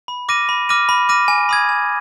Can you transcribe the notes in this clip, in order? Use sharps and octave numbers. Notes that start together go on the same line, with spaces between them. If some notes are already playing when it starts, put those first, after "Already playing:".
B5
D6 F6 A#6 D#7
B5
D6 F6 A#6 D#7
B5
D6 F6 A#6 D#7
G#5
B5 D#6 G#6
G#5